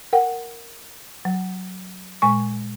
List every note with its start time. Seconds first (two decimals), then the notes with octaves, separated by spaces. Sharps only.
0.13 A#4 F#5 G5
1.25 F#3
2.22 A#2 G#3 G#5 C#6